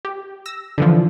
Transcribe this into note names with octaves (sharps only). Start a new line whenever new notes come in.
G4
E6 A#6
D3 E3 F3